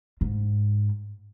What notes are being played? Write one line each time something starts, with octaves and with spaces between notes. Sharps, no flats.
G#2